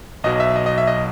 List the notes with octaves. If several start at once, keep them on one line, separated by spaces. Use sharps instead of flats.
B1 B2 F#3 D#5
E5
D#5
D#5
E5
D#5